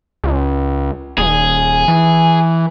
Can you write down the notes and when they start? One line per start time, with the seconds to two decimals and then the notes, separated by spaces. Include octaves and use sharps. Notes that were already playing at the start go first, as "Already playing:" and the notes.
0.24 C#2
1.18 D#1 G#4
1.88 E3